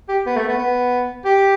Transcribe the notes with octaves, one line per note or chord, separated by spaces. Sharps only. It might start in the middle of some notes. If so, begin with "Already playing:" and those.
G4
B3
A3
B3
B3
G4